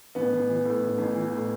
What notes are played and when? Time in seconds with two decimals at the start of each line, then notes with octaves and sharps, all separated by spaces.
0.15 A1 B3
0.32 A1
0.49 E3
0.65 A2
0.81 A1
0.98 A1
1.15 E3
1.32 A2